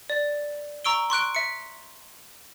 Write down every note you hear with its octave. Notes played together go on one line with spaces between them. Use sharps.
D5
A#5 C#6 E6 D7 G7
C6 C#6 F#6 D7
E5 C#7